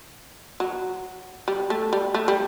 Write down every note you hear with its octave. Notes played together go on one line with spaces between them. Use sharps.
F#3
G3
A3
G3
A3
G3